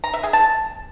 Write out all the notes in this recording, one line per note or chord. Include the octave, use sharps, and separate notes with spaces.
A#5
E5
G#4
A5